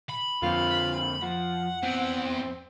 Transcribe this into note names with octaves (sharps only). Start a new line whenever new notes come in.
B5
F2 D3 A#3 C4 F4
F3 F#5
E3 B3 C4